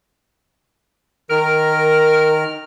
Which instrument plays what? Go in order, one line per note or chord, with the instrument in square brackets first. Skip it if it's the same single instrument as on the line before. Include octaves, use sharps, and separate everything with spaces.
[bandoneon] D#3 F6 [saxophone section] A#4